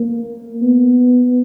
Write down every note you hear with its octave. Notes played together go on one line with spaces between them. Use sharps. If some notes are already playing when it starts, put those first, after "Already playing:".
Already playing: A#3
B3